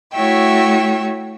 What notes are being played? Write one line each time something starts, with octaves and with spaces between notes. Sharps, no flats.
A3 E4 F#4 C#5 E5 G5